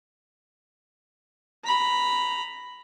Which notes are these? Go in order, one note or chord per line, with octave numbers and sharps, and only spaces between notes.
A#5 B5